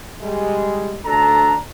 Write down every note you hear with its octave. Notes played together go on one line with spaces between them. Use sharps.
G3 G#3
D2 D4 A4 A#5